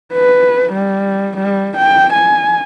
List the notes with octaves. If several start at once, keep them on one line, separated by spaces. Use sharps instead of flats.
B4
G3
G3
G5
G#5